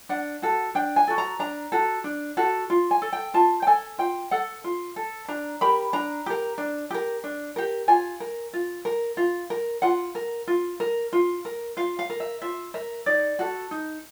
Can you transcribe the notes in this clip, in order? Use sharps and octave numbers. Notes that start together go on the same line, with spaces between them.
D4 F#5
F#4 A4
D4 G5
G#5
F#4 A4
A#5
D4 A#5
F#4 A4
D4
F#4 A4
F4
G#5
A4
G5
F4 A5
G5
A4 G#5
F4 G5
A4 F#5
F4
A4
D4 A#5
G4 A#4 B5
D4 A#5
G4 A#4
D4
G4 A#4
D4
G4 A#4
F4 G#5
A#4
F4
A#4
F4
A#4
F4 F#5
A#4
F4
A#4
F4
A#4
F4 F5
F5
A#4
E5
F4 E5
A#4 E5
D#4 D5
F#4 A4
D#4